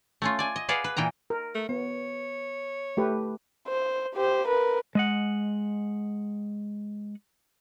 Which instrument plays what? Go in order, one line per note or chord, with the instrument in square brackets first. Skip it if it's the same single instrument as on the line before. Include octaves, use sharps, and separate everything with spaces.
[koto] A3 C#4 F4
D5 G#5
D#5
G#4 B4 D5 F5 F#5
B4
A#2 E3 G5 A#5
[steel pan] A#4
[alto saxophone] A3
[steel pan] B3 [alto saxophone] C#5
[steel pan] A3 G4 B4
[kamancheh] C5
G4 C5
A#4 B4
[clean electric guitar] G#3 D#5 F#5